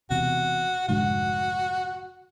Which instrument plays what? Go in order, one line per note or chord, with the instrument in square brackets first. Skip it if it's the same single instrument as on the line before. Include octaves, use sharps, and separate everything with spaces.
[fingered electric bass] E1 E2 C3 [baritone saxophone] F#4
[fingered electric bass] F1 G#2 D3 [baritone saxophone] F#4